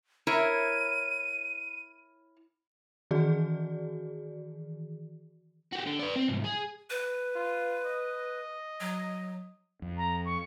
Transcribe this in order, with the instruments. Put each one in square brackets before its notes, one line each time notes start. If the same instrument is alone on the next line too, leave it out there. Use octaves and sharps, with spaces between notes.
[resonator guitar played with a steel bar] E4 A#4 C#5 [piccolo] D#7
[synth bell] D#3 E3 F#4 G#4 D5
[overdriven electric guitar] F#4 G4
D3
B4 D5
C4
C2 G#2
G#4
[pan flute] B4
[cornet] F4
D#5
[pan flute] F#3
[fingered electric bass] F2
[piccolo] A#5
C#6